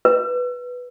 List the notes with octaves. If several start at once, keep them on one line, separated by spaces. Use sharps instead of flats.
B4